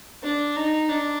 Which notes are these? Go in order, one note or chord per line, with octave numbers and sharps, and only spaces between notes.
D4
D#4
D4